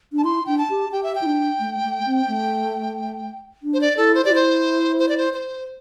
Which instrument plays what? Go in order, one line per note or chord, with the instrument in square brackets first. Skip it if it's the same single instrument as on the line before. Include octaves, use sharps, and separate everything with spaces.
[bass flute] D4
[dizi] A5
[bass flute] E4 [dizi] C6
[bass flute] D4 [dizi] G5
[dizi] A5
[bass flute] G4
[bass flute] G4 [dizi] G5
[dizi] E5
G5
[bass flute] E4
D4
A3
A3
C4
A3
D4
[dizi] C5
D5
[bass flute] E4 [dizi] A4
[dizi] C5
[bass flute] G4 [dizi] D5
[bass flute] E4 [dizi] C5
[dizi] C5
D5
C5
C5